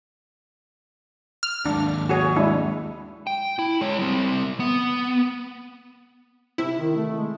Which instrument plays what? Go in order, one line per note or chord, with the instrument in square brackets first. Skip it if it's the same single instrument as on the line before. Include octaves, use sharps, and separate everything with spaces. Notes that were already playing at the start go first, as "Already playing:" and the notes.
[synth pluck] F6
[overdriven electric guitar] D#2 G#2 [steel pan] D4
[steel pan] F#4 G#4 C#5
[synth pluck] G#3 D4 [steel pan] E4
[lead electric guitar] G5
E4
G#3 C#5
G3 C4
B3
[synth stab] C3 E4
[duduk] D#3
A3
G#3